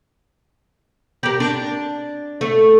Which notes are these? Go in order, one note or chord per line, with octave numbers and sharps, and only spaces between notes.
G4 A#4
D4
A3